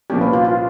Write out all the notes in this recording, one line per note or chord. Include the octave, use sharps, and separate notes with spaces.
C2 A#2 F3 A#3 C#4 G4
B4
F4
F4